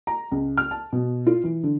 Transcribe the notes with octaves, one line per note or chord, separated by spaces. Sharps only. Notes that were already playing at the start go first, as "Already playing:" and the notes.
A#5
C#2
F6
A5
B2
F4
E3
D3